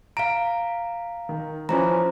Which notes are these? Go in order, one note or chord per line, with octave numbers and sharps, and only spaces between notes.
F5 A#5 D7
D#3
E3 F3 C#4 C5 A#5